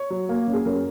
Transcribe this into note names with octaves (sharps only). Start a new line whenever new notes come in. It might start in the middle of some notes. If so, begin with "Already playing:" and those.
Already playing: C#5
F#3
A#3
F#2
G#4
F#2 A#4